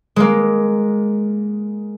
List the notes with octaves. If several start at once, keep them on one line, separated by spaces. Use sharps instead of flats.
G#3 A#3